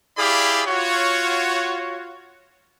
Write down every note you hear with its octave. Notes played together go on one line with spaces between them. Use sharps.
E4 G4 G#4 D5 F5 B5
F4 F#4 C#5